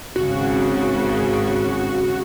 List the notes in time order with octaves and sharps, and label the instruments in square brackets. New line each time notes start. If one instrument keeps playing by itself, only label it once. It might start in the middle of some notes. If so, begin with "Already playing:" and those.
[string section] G#1 C#3 [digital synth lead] F#4